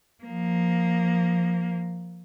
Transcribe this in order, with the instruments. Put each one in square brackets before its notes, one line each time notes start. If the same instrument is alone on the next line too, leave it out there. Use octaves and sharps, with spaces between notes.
[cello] F3 A#3